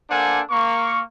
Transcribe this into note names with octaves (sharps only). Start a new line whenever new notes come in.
A#3 D4 A4 C5 F#5 G#5
A#3 C#6